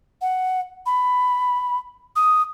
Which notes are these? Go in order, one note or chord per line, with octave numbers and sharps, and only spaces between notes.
F#5
B5
D#6